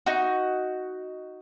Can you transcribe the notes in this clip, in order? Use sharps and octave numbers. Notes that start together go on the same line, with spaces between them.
D#4 F#4